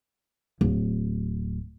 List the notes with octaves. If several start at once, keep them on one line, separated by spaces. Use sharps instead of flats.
D1